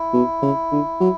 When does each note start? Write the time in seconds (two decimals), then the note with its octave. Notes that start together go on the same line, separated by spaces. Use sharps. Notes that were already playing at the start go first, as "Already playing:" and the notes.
Already playing: E4
0.13 B2
0.42 C#3
0.71 D3
1.00 F#3